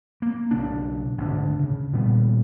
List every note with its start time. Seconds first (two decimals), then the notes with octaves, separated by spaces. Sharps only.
0.22 A#3
0.51 B1 C#3 D4
1.18 G#1 D2 D4
1.59 C#3
1.93 A#2 D#3 G3 B3